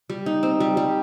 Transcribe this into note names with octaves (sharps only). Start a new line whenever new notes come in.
G3
D#4
C4
G3
G3